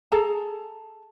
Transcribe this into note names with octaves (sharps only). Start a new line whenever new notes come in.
G#4 A4 A5 A#5